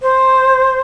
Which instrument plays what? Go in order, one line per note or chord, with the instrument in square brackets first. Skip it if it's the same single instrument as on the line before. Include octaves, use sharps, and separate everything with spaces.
[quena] C5